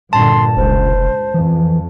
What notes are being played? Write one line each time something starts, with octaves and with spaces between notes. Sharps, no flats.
G2 A#2 D3 A5 C6
F1 C#2 C5
F2 E3